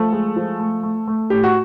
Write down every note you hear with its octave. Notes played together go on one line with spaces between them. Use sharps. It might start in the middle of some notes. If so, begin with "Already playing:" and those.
Already playing: F3 A3 A4
G#3
F3
A3
A3
A3
A2 G4
F#4